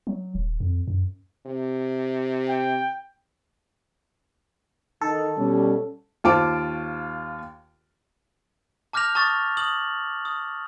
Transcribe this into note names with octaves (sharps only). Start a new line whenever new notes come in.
F#3
D#1
F2
F#2
C3
G5
D#3 A4
B2 G3 C#4
D#2 F4 C5 A5 D6 D7
A5 D6 F6 G6 A#6 F7
A5 C#6 D#6 A6
D#6 F#7
D#6